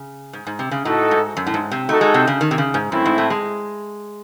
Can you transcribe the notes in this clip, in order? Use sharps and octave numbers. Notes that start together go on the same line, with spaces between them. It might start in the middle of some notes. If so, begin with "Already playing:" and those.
Already playing: C#3
G#2
G#2
C3
C#3
A2 D#4 F#4 A4 D#5
G#2
F#2
A2
G#2
C3
A3 D#4 F#4 A4
G#3
C3
C#3
D#3
C3
C#3
G#2
F#2 A3 C4 E4
G#2
A2
G#3